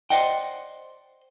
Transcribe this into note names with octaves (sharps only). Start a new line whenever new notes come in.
C5 D5 D#5 F#5 G5